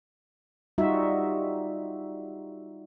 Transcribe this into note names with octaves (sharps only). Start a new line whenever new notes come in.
G3 D#4 F4 F#4 E5